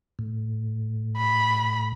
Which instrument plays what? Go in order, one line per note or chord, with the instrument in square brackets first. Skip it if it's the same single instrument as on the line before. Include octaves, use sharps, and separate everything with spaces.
[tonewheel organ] A2
[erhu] B5